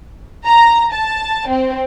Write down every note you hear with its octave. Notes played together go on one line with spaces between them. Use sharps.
A#5
A5
C4